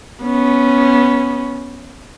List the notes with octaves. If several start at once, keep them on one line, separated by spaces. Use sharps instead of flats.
B3 C#4